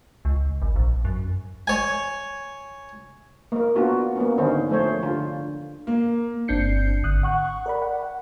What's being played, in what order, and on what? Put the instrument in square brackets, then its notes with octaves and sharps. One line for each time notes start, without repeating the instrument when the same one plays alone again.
[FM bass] C#2
G#1
A#1
F#2
[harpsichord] C#5 G#5
[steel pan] A#3 A#4
A#3 B3 D4 F4 F#4
A#3 B3 C#4
D3 D#3 C#4 C5
F3 A3 C5 C#5
D3 F4
[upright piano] A#3
[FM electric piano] G1 C4 D4 G6 C7 C#7
G#1 D3 D#6 F#6
F#5 C#6 F#6
A#4 D5 B5
F#5
F#5